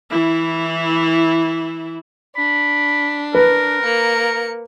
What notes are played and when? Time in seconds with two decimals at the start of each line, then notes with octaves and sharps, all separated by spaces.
0.11 E3 E4
2.36 D4 B5
3.35 A#4 B4
3.82 A#3 C#7